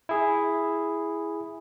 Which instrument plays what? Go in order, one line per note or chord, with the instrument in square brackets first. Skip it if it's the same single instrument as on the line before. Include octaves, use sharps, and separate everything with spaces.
[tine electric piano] E4 G#4